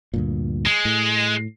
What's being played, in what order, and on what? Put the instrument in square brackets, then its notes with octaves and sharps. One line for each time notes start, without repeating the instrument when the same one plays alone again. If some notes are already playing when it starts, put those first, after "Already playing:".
[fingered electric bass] D2 G2 A#2
[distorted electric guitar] G#3
[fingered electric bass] A2